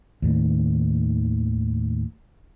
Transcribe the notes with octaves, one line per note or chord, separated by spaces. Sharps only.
D#2 A2 D#3